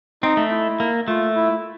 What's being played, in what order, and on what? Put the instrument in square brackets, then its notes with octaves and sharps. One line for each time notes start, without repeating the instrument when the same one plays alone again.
[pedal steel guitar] C4 [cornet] D#4
[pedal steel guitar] A3
[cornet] E4
[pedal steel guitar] A#3
[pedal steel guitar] A3 [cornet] F4
[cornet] E4